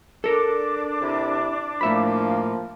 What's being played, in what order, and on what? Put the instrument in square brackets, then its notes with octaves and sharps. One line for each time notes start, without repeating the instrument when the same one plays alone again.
[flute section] D4 D6 [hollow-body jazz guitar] A4 A#4
[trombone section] C3 E4
[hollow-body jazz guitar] A2 E5 B5 [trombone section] F3 A#3